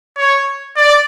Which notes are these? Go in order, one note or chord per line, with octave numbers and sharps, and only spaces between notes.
C#5
D5